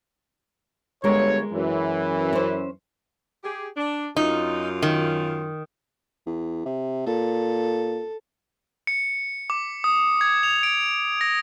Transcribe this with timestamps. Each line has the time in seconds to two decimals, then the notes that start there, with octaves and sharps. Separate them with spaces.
1.04 G1 G#3 A#4 C#5
1.53 F#2 E3
2.33 C#4 C5
3.44 G4 G#4
3.77 D4
4.17 F#2 D#4 F4
4.83 D#3
6.26 E2
6.65 C3
7.06 A#2 A4
8.87 C#7
9.50 D6
9.84 D#6
10.21 G#6
10.43 F7
10.63 D7
11.21 A#6